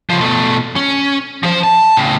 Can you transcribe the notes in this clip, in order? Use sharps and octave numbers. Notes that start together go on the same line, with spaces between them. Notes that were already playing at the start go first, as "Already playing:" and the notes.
C#3 F3
B2 A3
C#4
F3 C5
A5
A2 C#3